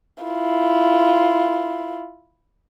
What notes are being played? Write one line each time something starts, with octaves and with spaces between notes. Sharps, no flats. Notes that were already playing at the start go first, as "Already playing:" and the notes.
E4 F4